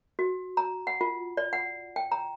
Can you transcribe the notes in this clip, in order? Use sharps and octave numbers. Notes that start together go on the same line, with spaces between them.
F#4
A#5
F#5
F4
D5
F#5
G5
A#5